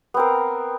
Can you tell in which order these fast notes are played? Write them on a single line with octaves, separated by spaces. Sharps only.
B3 C4 A#4